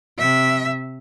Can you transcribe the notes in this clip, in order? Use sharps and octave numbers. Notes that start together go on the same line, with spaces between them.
C3 E5